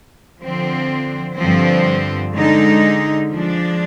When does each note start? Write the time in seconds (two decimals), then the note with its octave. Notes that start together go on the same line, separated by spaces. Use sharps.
0.42 D3 F3 C4
1.38 G2 D3 F3 C4
2.34 D3 G#3 D#4
3.30 F3 G#3 D4